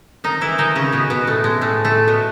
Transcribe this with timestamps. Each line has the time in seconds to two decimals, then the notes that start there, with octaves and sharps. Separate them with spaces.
0.24 D#3 D#4
0.41 E3 E4
0.58 D#3 D#4
0.75 C#3 C#4
0.92 B2 B3
1.10 B2 B3
1.27 A2 A3
1.44 G#3
1.61 A2 A3
1.85 A2 A3
2.08 B2 B3